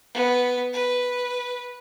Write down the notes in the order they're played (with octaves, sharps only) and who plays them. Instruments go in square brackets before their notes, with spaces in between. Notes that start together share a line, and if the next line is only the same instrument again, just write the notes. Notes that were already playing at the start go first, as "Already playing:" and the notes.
[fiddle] B3
B4